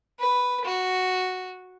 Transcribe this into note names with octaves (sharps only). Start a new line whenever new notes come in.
B4
F#4